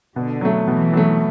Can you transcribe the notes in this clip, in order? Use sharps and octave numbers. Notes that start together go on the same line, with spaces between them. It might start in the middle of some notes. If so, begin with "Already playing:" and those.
B2 D3
F#3 A3
B2 E3
F#3 A3